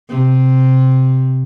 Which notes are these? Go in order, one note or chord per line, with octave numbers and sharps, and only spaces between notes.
C3